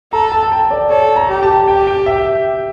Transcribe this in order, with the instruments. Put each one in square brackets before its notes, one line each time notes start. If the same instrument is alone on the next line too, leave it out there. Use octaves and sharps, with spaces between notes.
[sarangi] A4 [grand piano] A#5
[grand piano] A5
A5
G5
D5
[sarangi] A4 [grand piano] C#5
[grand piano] A#5
[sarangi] G4
[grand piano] A5
[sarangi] G4 [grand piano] G5
[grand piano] G5
E5